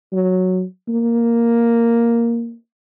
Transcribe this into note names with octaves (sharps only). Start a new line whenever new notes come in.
F#3
A#3